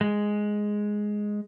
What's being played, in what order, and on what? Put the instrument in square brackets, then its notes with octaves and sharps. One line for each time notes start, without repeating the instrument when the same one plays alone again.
[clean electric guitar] G#3